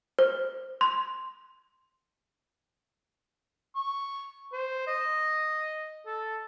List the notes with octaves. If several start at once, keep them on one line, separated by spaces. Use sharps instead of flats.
C5
C6
C#6
C5
D#5
A4